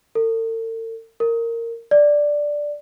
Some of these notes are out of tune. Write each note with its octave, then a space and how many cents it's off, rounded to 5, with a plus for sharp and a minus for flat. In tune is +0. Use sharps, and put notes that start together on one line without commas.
A4 +45
A#4 -15
D5 +0